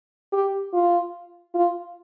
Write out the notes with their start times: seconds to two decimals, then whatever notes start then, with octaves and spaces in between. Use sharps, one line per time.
0.33 G4
0.73 F4
1.55 F4